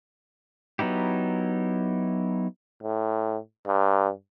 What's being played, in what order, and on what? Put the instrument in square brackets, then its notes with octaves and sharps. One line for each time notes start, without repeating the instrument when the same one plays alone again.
[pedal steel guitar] F#3 B3 D#4 E4 G4
[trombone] A2
G2